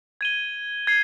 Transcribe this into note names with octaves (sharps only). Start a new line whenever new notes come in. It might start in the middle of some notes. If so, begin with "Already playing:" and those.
G#6 D#7 G7
G#6 C7